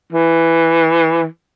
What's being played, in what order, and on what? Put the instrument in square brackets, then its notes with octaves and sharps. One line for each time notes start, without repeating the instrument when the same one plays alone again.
[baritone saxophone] E3